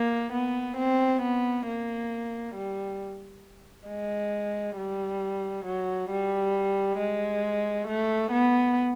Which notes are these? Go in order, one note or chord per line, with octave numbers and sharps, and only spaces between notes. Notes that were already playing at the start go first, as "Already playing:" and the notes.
Already playing: A#3
B3
C4
B3
A#3
G3
G#3
G3
F#3
G3
G#3
A3
B3